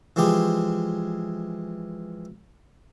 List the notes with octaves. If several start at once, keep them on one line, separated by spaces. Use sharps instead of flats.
E3 F3 G#3 G4 G#4